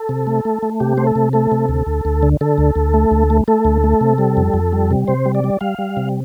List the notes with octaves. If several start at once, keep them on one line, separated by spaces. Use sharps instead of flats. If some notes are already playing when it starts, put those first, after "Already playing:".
Already playing: A4
C3
A3
A3
A3
C3 G4
A3 C5
A4
C3
A3 A4
C3
D2
D2
D2
D3
D3 A4
D2
D2
A3
D2
A3
A3 A4
D2
A3
C3
G3
F2
F2
G3
C3
C3 C5
G3
D5
G3
G3 F5
G3
C3